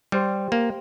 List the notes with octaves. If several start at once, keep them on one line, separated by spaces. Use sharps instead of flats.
G3 G4 C5 G5 C6
A#3